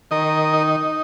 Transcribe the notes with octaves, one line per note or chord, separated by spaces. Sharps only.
D#3 A#4 D#5
D#4